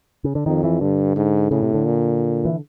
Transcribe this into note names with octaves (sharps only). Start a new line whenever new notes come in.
C#3
D3
F2 D#3
E3
G2 D3
G#2
A2 C#3
C3
D3
A#2
E3